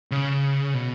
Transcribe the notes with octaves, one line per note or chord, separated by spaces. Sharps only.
C#3
B2